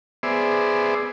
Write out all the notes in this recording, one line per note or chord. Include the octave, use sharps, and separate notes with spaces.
B3 G#4 C5 D5 E5